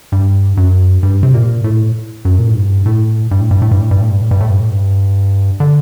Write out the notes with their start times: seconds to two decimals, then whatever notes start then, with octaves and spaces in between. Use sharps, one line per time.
0.12 G2
0.57 F#2
1.03 G2
1.23 C3
1.34 A#2
1.64 A2
2.25 F#2
2.39 A#2
2.47 A2
2.55 G2
2.86 A2
3.31 G2
3.41 A2
3.51 G2
3.62 A2
3.71 G2
3.81 A2
3.91 G2
4.01 A2
4.11 G2
4.21 A2
4.31 G2
4.40 A2
4.50 G2
4.60 A2
4.70 G2
5.60 D3